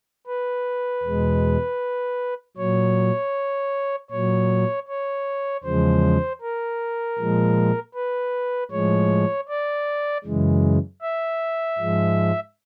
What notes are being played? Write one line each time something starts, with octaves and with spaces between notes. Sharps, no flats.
B4
E2 B2 G#3
A#2 F#3 C#5
A#2 F#3 C#5
C#5
E2 C#3 F3 G#3 C5
A#4
A#2 F3 G#3
B4
A2 F3 G#3 C#5
D5
F#2 C#3 E3 G#3
E5
G#2 F3 G#3